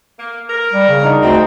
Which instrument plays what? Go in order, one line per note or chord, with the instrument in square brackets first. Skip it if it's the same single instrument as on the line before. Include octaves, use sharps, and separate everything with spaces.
[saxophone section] A#3
A#4
[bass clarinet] G3
C#3
[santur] D4 D#4 F#5
[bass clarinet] D2 [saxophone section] G#3 C4